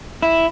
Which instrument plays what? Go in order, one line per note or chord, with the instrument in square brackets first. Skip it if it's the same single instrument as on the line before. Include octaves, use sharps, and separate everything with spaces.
[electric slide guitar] E4